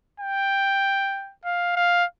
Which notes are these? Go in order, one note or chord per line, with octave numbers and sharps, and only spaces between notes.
G5
F5
F5